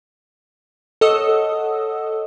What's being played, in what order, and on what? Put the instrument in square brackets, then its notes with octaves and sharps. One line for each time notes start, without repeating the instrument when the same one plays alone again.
[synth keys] A4 C#5 D#5 F#5 D#6 E6